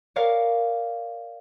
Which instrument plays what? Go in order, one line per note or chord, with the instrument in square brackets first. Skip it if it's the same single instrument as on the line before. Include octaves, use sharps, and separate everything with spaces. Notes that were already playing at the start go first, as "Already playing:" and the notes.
[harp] A#4 C#5 D5 F5